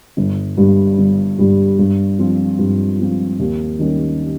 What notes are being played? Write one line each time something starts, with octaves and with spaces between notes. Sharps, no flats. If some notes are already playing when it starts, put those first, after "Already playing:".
G1
G2 G3
G1
G2 G3
G2
F3 C4 F4
G2
F3 C4 F4
D#2
D#3 G3 C#4 G4